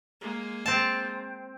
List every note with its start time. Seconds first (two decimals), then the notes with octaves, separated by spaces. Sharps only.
0.21 G#3 A#3
0.66 C4 A5